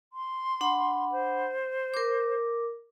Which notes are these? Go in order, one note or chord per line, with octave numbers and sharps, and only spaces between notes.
C6
D4 F#5 B5
C5
A#4 D6